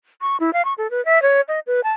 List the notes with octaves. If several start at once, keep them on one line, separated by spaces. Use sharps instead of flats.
C#6
E4
F5
C#6
A4
B4
E5
C#5
D#5
B4
A5